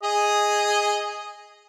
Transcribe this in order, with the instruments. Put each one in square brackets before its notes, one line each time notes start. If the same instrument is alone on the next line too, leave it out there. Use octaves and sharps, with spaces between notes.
[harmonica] G#4 D#5